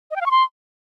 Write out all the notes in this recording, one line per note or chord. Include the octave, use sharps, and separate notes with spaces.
D#5
G5
F5
C#6
C6